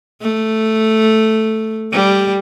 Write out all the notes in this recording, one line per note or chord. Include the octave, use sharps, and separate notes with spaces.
A3
G3